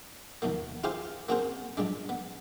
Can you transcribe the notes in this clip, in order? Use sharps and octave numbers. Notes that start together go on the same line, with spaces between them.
D#2 B2 F3 A#3
E4 F4 G4 G#4 C5 F5
A#3 C4 F#4 G#4 A#4 C5
F3 G3 G#3 D4
B3